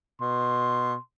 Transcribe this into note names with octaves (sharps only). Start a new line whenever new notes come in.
B2 C6